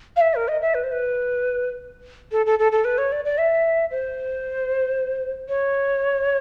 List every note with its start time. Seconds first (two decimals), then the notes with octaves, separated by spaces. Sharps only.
0.16 F5
0.21 E5
0.35 A#4
0.48 D#5
0.61 E5
0.74 B4
0.84 C5
0.92 B4
2.32 A4
2.46 A4
2.59 A4
2.72 A4
2.84 B4
2.98 C#5
3.12 D5
3.25 D5
3.38 E5
3.91 C5
5.49 C#5